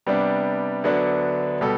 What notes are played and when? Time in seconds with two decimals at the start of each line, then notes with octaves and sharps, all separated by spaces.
0.06 C3 G3 B3 D4
0.84 D2 D3 F#3 B3 D4
1.61 B2 G3 B3 A4